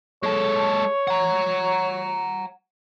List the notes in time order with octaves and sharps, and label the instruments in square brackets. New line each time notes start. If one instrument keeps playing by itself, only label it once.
[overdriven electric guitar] G#3 A4 [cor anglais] C#5
[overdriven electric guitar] F#5 A#5